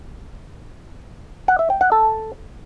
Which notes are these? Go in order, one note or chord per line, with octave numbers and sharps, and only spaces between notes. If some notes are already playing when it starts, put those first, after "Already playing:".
F#5
E5
G5
F#5
A4